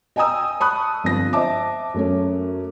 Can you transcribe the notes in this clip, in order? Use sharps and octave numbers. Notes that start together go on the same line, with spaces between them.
D#5 G5 G#5 A#5 D#6 E6
A5 B5 C#6 D#6 F#6
G1 F3 C4 A#6
C5 D#5 E5 A5 D6
F#2 A3 C#4